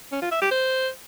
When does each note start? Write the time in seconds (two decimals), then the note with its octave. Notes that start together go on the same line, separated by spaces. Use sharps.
0.12 C#4
0.22 F4
0.32 E5
0.42 G4
0.51 C5